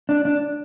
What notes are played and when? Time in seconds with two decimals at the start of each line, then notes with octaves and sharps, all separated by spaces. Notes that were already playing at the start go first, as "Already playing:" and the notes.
0.09 D4
0.25 D4